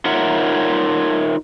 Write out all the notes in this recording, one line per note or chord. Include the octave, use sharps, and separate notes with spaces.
D#4 F4 A#4 C#5 E5 F#5